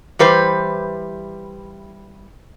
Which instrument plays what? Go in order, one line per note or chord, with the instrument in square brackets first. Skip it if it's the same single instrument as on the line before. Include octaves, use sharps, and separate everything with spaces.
[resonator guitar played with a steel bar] E3 G3 B4 C5